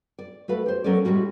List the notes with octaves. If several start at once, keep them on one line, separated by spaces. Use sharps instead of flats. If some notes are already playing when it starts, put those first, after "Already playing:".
D5
A3 F#4 B4 F5
G4 C5
F#3 A#3 C#4 A4 A#4 D5
A2 G3 G#3 A#3 F#4